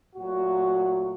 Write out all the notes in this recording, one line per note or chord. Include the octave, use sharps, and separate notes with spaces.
A#2 F#3 A3 F#4